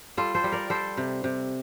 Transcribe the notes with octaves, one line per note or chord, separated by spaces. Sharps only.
G3 F4 A4
A4 C5
G3
A#4 D5
G3 A4 C5
C3
C3